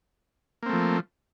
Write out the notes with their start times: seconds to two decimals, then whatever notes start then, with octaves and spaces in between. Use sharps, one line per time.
0.63 A#3
0.66 C4
0.69 A3
0.73 F3